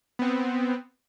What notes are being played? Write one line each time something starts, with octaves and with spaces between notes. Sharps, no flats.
B3 C4